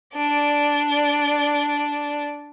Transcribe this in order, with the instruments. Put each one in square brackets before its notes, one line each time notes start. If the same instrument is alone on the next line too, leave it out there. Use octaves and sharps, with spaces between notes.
[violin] D4 D5